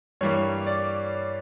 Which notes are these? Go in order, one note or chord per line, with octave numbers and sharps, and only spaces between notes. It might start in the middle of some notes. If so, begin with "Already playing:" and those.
G2 E3 G3 A#3 C#5
D5